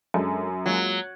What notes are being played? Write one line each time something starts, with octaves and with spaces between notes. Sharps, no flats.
F#2 G#3 D4 A4
F#3 G#3 A#3 F4